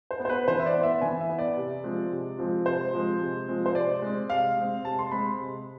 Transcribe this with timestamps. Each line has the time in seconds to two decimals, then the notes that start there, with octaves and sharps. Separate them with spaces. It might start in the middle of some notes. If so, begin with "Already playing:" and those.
0.11 C5
0.20 B3
0.25 C5
0.29 B4
0.48 E3 C5
0.59 E5
0.66 D5
0.75 B3
0.83 E5
1.01 E3 G#5
1.21 E5
1.29 B3
1.39 D5
1.57 C3
1.84 F3 G#3 C4
2.12 C3
2.39 F3 G#3 C4
2.66 C3 C5
2.93 F3 G#3 C4
3.20 C3
3.48 F3 G#3 C4
3.66 C5
3.75 C3 D5
4.02 G#3 C4
4.30 C3 F5
4.56 G#3 C4
4.85 C3 A5
4.99 C6
5.11 G#3 C4 B5
5.39 C3